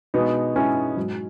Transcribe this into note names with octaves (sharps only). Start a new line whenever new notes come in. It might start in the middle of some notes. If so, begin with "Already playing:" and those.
B2 G#3 B3 D#4
B2 G#3 C#4 E4
G#2 F#3